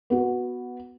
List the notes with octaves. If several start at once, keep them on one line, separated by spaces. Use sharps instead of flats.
B3 F#4